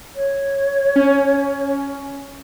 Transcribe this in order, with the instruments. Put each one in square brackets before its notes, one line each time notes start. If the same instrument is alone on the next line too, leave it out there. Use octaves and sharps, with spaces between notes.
[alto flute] C#5
[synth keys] C#4